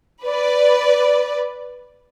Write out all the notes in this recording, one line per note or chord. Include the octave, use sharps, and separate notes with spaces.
B4 D5